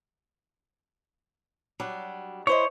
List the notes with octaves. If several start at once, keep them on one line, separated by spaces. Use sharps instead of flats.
F#3 G3 D4
E4 C5 C#5 D#5